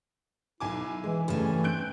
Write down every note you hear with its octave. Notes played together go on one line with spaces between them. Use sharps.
B1 E4 G#5 D6
E3 G#3
G2 C#3 E3 A3 C#4
C4 F#6 G6 D7